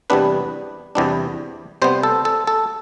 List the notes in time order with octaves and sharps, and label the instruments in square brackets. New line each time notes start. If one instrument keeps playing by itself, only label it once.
[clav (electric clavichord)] E2 C3 G3 B3 D4 B4
E2 C3 G3 B3 D4
C3 G3 B3 C5
A4
A4
A4